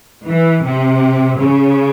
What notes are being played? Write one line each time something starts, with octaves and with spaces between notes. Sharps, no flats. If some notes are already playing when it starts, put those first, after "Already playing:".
E3
C3
C#3